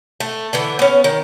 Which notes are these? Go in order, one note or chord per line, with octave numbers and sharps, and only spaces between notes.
A3
D3 E3 B3
B3 C#4
D#3